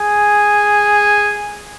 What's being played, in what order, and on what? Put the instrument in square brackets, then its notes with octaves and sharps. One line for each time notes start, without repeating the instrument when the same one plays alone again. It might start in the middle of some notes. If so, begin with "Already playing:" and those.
Already playing: [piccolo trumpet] G#4